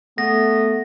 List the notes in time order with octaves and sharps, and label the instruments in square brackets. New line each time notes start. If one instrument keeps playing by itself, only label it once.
[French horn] A3 [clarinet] B3 [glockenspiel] A#6